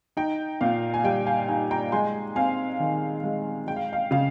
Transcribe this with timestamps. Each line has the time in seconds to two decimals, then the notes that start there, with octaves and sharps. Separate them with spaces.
0.17 D#4 G5
0.61 A#2 F5
0.94 G#5
1.04 G3 G5
1.26 F5 G#5
1.48 D#4 F5 G#5
1.71 G5 A#5
1.92 G#3 G#5 C6
2.36 C4 F5 G#5
2.80 D#3
3.24 G#3
3.67 G#3 G5
3.76 F5
3.93 F5
4.11 C#3 F5